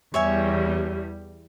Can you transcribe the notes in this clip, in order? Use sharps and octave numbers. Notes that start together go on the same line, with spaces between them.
E2 G3 C#5 E5 G#5